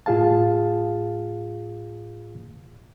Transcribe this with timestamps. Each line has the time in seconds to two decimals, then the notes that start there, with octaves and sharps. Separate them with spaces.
0.06 A2 F4 G#4 F5 A5